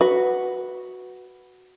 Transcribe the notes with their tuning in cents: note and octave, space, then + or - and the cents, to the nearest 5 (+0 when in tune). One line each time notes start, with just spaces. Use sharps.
F#4 +0 B4 +0